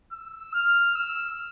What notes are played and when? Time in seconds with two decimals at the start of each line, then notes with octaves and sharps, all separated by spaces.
0.12 E6
0.54 F6
0.95 E6